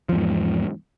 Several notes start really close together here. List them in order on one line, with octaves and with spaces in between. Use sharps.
F3 E2 G#2